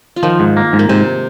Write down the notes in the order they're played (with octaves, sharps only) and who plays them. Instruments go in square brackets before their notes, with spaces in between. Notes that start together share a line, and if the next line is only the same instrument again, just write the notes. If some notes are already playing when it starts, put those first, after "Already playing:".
[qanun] F4
[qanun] D#3 D#4 [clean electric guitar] F3
[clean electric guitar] G#2
A#3
G#2
[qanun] A#3
[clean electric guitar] G#2 [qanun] C3 C4